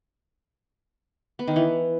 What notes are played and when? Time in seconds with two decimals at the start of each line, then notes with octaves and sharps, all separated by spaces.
1.39 B3
1.48 D#3
1.56 E3